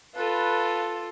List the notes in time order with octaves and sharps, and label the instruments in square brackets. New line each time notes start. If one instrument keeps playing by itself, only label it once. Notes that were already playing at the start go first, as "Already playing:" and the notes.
[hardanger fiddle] F4 A4 [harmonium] B4